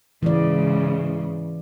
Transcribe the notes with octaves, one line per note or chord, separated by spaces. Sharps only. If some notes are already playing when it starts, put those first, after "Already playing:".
G#2 C#3 E3 D5